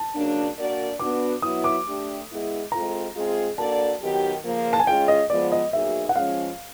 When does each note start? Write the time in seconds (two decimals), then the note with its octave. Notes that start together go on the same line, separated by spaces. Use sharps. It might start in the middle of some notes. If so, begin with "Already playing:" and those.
Already playing: A5
0.14 C#3 F#3 A#3 D4
0.57 A#3 D4 F#4 A#4 D5
0.99 B3 D4 F#4 D6
1.42 F#3 B3 E4 D#6
1.64 D6
1.86 A3 D4 G4
2.29 G#3 B3 E4 G#4
2.72 G#3 C4 F4 A4 A#5
3.14 G#3 C4 F4 G#4
3.57 A#3 D4 F#4 A4 D5 A5
4.01 D#3 F#3 B3 D#4 G4
4.43 C#3 F3 A#3
4.73 A5
4.79 G#5
4.87 G#3 C#4 F4 G#4 G5
5.08 D#5
5.29 F3 G#3 B3 D5
5.52 D#5
5.73 B2 F#3 A#3 D#4 G#4 E5
6.09 F#5
6.16 F3 G#3 C#4 F5